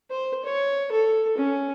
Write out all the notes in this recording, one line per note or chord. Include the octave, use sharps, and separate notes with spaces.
C5
C#5
A4
C#4